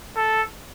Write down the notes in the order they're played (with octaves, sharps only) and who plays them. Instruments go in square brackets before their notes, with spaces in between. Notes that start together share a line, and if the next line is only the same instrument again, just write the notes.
[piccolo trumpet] A4